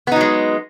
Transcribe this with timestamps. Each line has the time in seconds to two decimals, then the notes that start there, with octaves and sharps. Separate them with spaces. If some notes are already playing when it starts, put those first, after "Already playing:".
0.07 B3
0.12 D#4
0.16 F#3
0.21 G#3